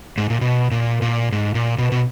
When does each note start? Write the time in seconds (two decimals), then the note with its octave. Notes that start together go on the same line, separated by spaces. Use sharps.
0.18 G#2
0.30 A#2
0.41 B2
0.71 A#2
1.02 A#2
1.32 G#2
1.55 A#2
1.78 B2
1.92 B2